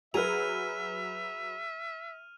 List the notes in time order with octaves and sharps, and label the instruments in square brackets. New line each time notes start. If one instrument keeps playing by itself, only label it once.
[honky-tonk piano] F#3 B4 [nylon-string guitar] G#4 [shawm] E5 [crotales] F6 D#7 F7